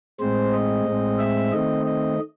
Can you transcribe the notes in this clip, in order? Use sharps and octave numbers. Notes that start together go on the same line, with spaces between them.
A2 G#3 C4 C5
D#5
A2 G#3 C4
E5
D#3 A3 C4 D#5
D#5